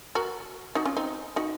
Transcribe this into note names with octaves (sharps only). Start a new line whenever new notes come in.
F#4 A#4
D#4 F#4
C#4 F4
C4 D#4
D#4 F#4